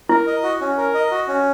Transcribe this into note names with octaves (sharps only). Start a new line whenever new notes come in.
E4 A#4
D#5
F#4
C#4
A#4
D#5
F#4
C#4